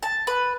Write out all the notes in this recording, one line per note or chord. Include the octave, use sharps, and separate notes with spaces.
A5
B4